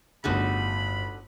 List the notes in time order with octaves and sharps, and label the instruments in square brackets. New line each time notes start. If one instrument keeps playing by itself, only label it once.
[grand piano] G1 A2 G#4 [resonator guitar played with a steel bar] D3 D#4 F#4 [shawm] B5